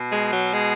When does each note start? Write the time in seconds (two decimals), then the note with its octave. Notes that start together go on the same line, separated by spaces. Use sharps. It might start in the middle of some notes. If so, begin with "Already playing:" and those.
Already playing: B2
0.12 G#3
0.33 F#3
0.54 G#3